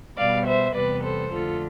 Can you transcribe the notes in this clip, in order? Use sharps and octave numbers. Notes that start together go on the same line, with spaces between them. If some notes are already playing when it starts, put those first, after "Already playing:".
B2 G3 B3 D5 F5
C5 E5
E2 C3 G3 B3 B4 D5
A4 C5
F2 D3 A3 F4 A4